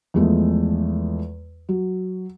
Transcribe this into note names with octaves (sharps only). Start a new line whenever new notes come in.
E2 F3 G#3 A3
F#3